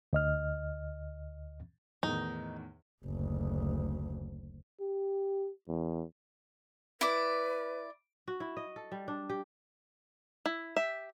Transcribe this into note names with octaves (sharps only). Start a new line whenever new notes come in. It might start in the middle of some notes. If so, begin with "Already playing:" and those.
D2 D#5 F6
E2 A2 D#3 D#4
F#1 D2
G4
E2
E4 B4 D5 D6
F#4
E4
D#5
A4
G3
D4
G4
E4
G4 E5